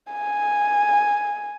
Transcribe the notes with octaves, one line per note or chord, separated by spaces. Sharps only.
G#5